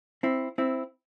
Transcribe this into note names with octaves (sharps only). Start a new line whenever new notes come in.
C4 E4
C4 E4